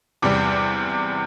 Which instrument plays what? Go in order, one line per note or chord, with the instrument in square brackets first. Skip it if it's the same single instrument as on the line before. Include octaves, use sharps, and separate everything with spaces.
[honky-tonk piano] E2 C3 G3 D6